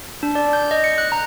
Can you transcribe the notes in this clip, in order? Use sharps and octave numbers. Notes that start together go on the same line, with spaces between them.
D4
D5
G6
D#5
C#7
F#6
A#5